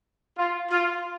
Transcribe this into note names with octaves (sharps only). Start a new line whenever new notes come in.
F4
F4